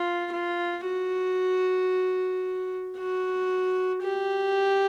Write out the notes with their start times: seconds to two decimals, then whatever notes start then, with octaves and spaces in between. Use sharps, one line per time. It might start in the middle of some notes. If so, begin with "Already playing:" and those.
Already playing: F4
0.32 F4
0.85 F#4
2.97 F#4
4.02 G4